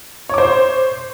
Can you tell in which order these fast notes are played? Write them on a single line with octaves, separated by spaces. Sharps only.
C#5 D6 C5